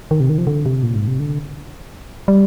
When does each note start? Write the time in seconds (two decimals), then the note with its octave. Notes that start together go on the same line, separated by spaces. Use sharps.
0.11 D#3
0.20 C3
0.29 D#3
0.38 F3
0.47 D3
0.66 C3
0.83 A#2
0.95 G#2
1.08 C3
1.19 D3
2.28 G3